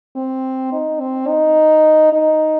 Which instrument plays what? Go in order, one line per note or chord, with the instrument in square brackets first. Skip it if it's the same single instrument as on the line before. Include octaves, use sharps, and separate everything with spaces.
[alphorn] C4
D#4
C4
D#4
D#4